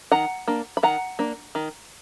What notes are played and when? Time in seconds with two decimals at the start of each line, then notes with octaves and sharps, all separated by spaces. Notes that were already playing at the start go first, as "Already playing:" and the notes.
0.12 D#3 F#5 A#5
0.48 A#3 D4
0.77 B5
0.83 D#3 F#5 A#5
1.19 A#3 D4
1.55 D#3